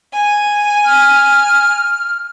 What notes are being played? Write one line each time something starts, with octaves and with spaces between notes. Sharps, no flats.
G#5
F6